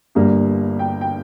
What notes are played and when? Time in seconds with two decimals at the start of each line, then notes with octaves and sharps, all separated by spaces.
0.15 G1 G2 G3 A#3
0.79 G5
1.01 G5